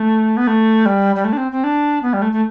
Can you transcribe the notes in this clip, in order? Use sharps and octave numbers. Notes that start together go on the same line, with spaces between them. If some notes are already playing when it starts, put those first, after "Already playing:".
Already playing: A3
B3
A3
G3
G3
A3
D4
C4
C4
D4
B3
G3
A3
A3